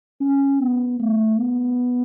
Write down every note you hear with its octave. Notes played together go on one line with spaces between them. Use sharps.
C#4
B3
A3
B3